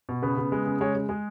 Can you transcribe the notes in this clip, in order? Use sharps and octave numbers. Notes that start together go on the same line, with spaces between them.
B2
C#3 B3 B4
C#3
G#3
C#3
G#3 C#4 C#5
G#3
G#3 G#4